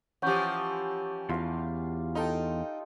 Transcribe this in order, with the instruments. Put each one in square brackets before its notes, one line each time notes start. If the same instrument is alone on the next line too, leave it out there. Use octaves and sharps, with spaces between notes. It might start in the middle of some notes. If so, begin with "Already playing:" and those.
[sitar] E3 F3 [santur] C#4 G4 [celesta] F#5 C#6 G6
[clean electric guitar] E2 [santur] F4 F5
[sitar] D#4 [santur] F4 A4 G5